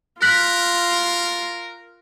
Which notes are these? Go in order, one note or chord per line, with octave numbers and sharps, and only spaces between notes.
F4 A#4 F#6 B6 F#7